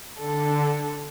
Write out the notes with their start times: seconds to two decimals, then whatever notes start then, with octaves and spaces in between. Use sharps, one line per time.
0.19 D3 A4